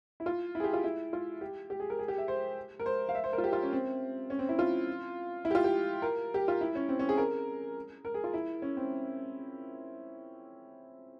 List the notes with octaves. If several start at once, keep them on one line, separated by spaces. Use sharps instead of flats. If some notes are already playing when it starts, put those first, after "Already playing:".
E4
F4
E4
G#4
G4
F4
E4
F4
G4
G4
G#4
A#4
G#4
G4
E5
C5
A#4
C5
F5
E5
C5
A#4
F4
G4
F4
C#4
C4
C#4
C4
E4
F4
E4
G4
F4
G4
A#4
G4
F4
E4
C#4
C4
C#4
G#4
A#4
A#4
G#4
F4
E4
C#4
C4